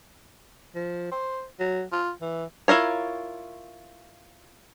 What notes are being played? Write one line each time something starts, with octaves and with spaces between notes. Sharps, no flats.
F3
C5
F#3
F4
E3
E4 F4 A#4 C#5